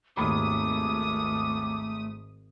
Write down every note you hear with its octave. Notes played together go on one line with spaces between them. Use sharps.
G#1 D#2 A3 B5 D6 D#6